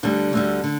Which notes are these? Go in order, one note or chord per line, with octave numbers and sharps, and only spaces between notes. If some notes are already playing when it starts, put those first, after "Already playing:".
D2 D3 G3
D2 D3 G3
D3